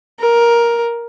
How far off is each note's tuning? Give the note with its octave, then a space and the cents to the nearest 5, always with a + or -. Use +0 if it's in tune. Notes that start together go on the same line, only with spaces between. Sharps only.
A#4 +10